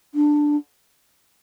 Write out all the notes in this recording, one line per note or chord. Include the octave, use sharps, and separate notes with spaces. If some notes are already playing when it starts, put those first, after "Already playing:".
D4